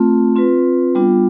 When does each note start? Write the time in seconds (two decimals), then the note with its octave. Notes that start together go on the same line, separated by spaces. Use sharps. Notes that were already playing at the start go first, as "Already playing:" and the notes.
Already playing: A3 C4 F4
0.36 C4 F4 B4
0.95 G3 B3 D4 F4